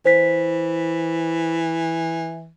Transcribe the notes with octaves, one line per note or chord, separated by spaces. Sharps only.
E3 C5 B6